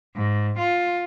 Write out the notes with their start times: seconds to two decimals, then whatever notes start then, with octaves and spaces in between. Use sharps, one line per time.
0.16 G#2
0.58 F4